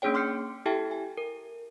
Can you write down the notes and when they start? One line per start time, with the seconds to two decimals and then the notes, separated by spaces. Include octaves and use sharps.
0.02 A#3 C#4 D4 G#4 C#5 G5
0.14 C6 D6 F6 G6 C7 C#7
0.66 E4 G4 A4 E5 G5 A5
0.91 G#5
1.17 A#4